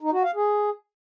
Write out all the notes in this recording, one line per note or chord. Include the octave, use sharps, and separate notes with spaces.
D#4
F#4
F5
G#4